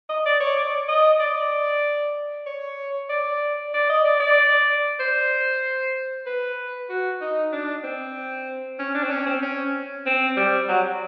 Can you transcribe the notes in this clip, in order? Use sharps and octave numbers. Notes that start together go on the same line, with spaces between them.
D#5
D5
C#5
D5
D#5
D5
C#5
D5
D5
D#5
D5
D5
C5
B4
F#4
D#4
D4
C4
C#4
D4
C4
C#4
C4
C#4
C4
G3
F#3